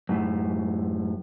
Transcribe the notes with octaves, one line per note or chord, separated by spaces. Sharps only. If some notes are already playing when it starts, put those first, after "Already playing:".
F#2 A2